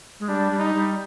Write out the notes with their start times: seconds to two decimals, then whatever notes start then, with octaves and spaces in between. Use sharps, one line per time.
0.20 G#3
0.28 G3 D4
0.51 G3
0.59 D#4
0.74 G3